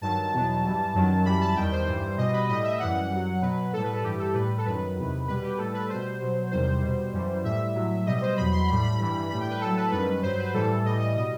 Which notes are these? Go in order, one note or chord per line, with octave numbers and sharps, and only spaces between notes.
G2 D#3 F#3 A5
E2 B2 F#3
G2 E3 G3
F#2 D#3 F#3
F#2 E3 G3 B5
A5
E2 D#3 G3 G5
C5
G2 E3 G3
B2 G3 D#5
B4
A2 G3 D#5
E5
F#2 E3 G3 F#5
F#2 F#3
B2 F#3 B4
A2 G3 A4
B4
A4
G2 E3 G3 G4
A4
A2 G3 B4
A4
F#2 D#3 F#3 B4
E2 C3 D#3
B2 G3 B4
G4
A2 G3 A4
B4
B2 G3 C5
B2 F#3
E2 C3 D#3 G3 C5
B2 G3
F#2 E3 G3
A2 G3 E5
A2 F#3
B2 G3 D#5
D#5
C5
E2 B2 F#3 B5
C6
A2 G3 B5
B5
G2 E3 G3 B5
B5
A2 G3 B5
G5
B4
A2 F#3 A4
B4
F#2 D#3 G3 B4
G2 F#3 C5
B4
A2 E3 G3 A4
A2 E3 G3 D#5
D#5
B2 G3 D#5